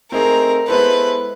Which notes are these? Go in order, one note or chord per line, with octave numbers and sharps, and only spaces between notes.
A3 C4 D#4 G#4 A#4
G#3 B3 E4 A4 B4 C5